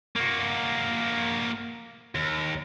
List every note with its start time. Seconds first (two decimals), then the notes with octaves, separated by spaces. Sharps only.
0.16 A#3 F#4
2.15 D#2